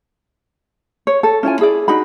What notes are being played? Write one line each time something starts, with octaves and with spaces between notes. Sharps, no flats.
C#5
A4
C#4 E4 F4 G#5
E4 G#4 D5
D4 D#4 F#4 B5